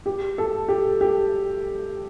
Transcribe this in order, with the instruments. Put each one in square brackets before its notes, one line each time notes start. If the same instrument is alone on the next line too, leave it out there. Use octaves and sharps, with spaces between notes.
[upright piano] G4
A4
G4
G4